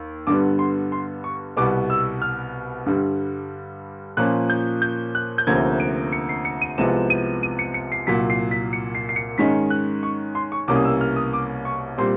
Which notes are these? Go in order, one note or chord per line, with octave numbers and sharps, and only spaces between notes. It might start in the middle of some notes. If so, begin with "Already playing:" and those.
Already playing: D#2
G2 D3 G3 B3 D6
C6
C6
C#6
C2 B2 G3 B3 D6
E6
F6
G2 D3 G3
A#2 F3 A#3 C#4 F#6
G6
G6
F#6
G6
D2 C3 F3 A#3 C#4 G#6
D7
C#7
C7
C#7
D#7
C2 C3 F3 G#3 B3 E7
D#7
D#7
C#7
C#7
C7
C2 A#2 F#3 B6
C7
B6
C#7
C7
C7
C#7
G#2 D#3 G#3 C#4 B6
F#6
C#6
C6
C#6
C2 B2 G3 A#3 C#4 D6
D#6
E6
F6
D#6
D6
C#6
A#2 G3 C4 C6